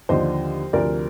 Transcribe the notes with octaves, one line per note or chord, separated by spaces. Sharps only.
D#2 D3 F3 C5 D#5
D2 C3 F3 A#4 D5